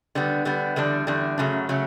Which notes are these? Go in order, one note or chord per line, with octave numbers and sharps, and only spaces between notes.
D3 G3 B3
D3 G3 B3
E2 D3 G3 D4
E2 D3 G3 D4
F#2 C#3 F#3 A3
C#3 F#3 A3